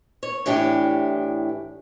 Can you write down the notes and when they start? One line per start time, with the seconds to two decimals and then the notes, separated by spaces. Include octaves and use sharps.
0.23 C#5
0.46 A2 E3 D4 G4